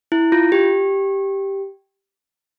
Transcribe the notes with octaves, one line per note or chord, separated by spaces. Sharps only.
E4
F4
G4